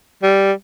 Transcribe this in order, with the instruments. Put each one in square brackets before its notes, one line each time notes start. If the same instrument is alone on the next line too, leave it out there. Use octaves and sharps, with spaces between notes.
[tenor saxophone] G3